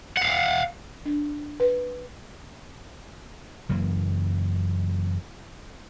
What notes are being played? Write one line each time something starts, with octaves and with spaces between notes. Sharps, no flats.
F5 F#5
D4
B4
F#1 F#2 E3 A#3